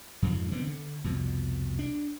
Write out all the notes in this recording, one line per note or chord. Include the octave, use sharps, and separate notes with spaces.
F2 G#2 C#3 F3
D3 D#3 B3 C4
D3
C2 F2 B2
D4